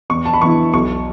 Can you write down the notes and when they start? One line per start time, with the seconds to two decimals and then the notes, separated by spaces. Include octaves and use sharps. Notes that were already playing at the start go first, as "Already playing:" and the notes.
0.10 E2 C#6
0.25 A5
0.34 B5
0.42 E3 B3 E4 C#6
0.73 B1 C#6